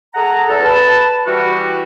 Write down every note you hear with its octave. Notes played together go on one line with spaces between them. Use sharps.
G#4 A4 F#5 A#5
E2 A4
B4 A5
E3 G3 F#4